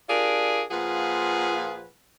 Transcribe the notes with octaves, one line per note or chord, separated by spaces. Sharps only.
D4 F4 G4 G#4 A#4 D5
A#2 F3 F4 G#4 B4 F#5